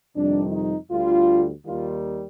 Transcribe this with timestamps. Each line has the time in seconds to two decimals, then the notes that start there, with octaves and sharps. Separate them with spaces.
0.14 F2 C3 D#3 G3 D4
0.52 D#4
0.90 D2 D3 G3 F4
1.66 D#2 D#3 G3 F4